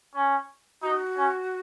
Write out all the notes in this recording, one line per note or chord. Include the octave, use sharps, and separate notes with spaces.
C#4
D#4 F#4
C#4